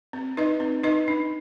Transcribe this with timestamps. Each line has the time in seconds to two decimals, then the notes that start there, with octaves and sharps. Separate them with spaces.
0.13 C4
0.37 D#4 B4 D#5
0.60 C4
0.83 D#4 B4 D#5
1.08 D4